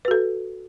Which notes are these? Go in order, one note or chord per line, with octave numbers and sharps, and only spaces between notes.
F#4 A4 B4